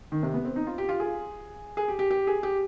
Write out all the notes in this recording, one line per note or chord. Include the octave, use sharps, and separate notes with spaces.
D#3
C3
B3
C4
D#4
F4
G4
F4
G#4
G#4
G4
G4
G4
G#4
G4